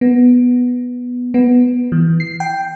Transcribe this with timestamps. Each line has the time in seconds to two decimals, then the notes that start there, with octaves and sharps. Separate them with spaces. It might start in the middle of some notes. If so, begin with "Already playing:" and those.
0.01 B3
1.34 B3
1.92 E3
2.20 C7
2.40 G5